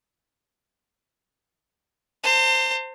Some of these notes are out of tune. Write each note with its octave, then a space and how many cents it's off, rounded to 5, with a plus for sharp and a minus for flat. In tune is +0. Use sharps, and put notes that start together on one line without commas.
C5 +0 A5 +45